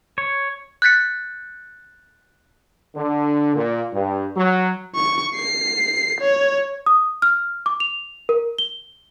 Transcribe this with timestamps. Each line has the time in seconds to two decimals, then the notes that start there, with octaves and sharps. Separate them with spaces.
0.18 C#5
0.82 F#6 G6 A6 B6 C#7
2.96 D3
3.56 A#2
3.93 G2
4.36 F#3
4.95 C#6
5.36 C7
6.21 C#5
6.86 D#6
7.22 F6
7.66 D6
7.80 F7
8.29 A#4
8.58 G7